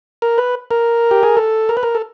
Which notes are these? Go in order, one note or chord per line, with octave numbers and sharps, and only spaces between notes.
A#4
B4
A#4
G4
G#4
A4
A#4
B4
A#4
A4